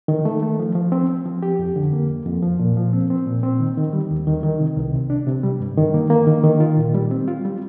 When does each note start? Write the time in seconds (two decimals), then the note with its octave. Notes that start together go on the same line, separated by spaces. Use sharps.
0.08 D#3
0.25 A3
0.43 A3
0.60 F3
0.75 F3
0.92 C4
1.10 C4
1.25 F3
1.43 G4
1.59 F2
1.76 D3
1.93 A#3
2.09 F2
2.26 F2
2.42 F3
2.60 A#2
2.77 F3
2.93 C4
3.10 C4
3.26 A#2
3.43 C4
3.59 D#3
3.77 D#3
3.93 G3
4.11 D#2
4.27 D#3
4.43 D#3
4.60 C3
4.77 C2
4.93 C3
5.10 D4
5.27 C3
5.43 G3
5.60 G2
5.78 D#3
5.94 A#3
6.10 A#3
6.27 D#3
6.44 D#3
6.60 F4
6.77 A#2
6.94 G3
7.11 C4
7.28 F4
7.45 G3